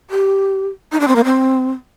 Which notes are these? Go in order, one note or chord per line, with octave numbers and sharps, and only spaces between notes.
G4
D#4
D4
C4
A#3
C4